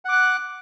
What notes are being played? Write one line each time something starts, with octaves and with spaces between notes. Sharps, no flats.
F#5 D6 F#6